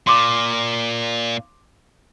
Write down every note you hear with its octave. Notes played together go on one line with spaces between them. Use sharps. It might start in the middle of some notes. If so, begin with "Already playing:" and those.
A#2 C6 D6